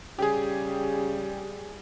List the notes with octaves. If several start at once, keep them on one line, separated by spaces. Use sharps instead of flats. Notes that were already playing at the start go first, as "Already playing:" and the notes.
C#3 G3 G4 G#4